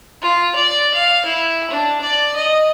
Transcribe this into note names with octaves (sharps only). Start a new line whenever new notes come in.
F4
D5
F5
E4
D4
D5
D#5